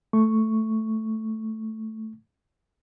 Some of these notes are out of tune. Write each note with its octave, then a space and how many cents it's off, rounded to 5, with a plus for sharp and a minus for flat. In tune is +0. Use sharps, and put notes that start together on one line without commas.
A3 +0 C#6 +0